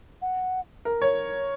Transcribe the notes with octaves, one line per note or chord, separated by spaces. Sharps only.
F#5
A#4
C#5